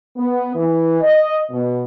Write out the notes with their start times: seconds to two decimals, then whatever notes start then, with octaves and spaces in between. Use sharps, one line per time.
0.17 B3
0.55 E3
1.01 D#5
1.51 B2